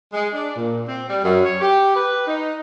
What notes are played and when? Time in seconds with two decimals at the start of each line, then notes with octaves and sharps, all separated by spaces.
0.13 G#3
0.34 D4
0.57 A#2
0.87 C4
1.09 G3
1.24 F#2
1.45 C#5
1.61 G4
1.95 B4
2.27 D#4